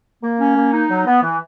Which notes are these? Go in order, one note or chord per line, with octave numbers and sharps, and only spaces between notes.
A#3
C#4
A#3
D#4
F#3
B3
E3